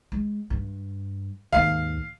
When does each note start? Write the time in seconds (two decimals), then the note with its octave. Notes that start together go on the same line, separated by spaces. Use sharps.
0.12 G#3
0.50 G2
1.53 D#2 G#2 F5 C7